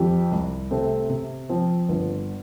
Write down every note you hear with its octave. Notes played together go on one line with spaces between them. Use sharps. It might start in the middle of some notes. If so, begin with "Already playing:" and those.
Already playing: F2 F3 C4 G4
C2
C3 A3 C4
C3
F3 C4
G1